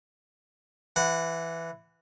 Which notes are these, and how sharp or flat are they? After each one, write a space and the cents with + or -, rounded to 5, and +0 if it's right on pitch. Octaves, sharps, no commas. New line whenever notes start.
E3 +10 F#5 -10